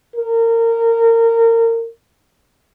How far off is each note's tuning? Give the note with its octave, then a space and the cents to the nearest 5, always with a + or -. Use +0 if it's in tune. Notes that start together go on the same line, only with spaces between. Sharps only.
A#4 -25